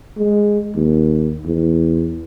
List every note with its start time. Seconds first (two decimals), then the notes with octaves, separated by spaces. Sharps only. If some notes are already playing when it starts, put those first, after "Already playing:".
0.17 G#3
0.75 D#2
1.45 E2